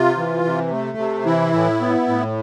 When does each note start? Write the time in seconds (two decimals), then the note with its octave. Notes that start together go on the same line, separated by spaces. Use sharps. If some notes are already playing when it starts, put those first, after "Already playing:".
Already playing: C3 F4
0.17 E3
0.44 C3
0.71 A3
0.98 C3
1.25 E3 E4
1.53 A2
1.81 B3
2.08 A2